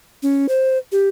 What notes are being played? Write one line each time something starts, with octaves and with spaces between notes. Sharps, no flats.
C#4
C5
G4